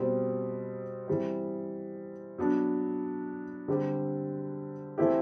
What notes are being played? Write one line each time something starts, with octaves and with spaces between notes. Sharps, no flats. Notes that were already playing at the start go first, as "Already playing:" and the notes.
Already playing: B2 G3 C4
E3 G3 C4
F#3 B3 D4
D3 G3 C4 G4
E3 A3 C4 E4 G4